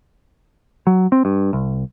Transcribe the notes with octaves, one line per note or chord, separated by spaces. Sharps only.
F#3
C4
G2
C2